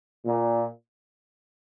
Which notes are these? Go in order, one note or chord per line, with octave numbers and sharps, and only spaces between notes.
A#2